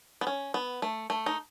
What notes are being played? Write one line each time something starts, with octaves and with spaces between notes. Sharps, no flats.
B3
C#4
B3
A3
A3
D#4